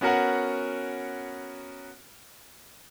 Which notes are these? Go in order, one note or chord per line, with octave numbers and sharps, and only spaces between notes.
B3 C#4 F#4 A#4 F#5